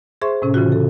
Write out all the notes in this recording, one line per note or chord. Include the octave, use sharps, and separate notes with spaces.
G#4 C5 E5 C6 C#6
A2 C3 C#4
C#3 E3 F4 F#4
A4